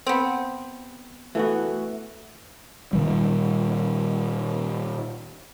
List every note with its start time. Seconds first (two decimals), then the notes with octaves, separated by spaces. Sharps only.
0.07 B3 C4
1.35 E3 A3 B3 E4 F#4 A4
2.93 A#2 D#3 G3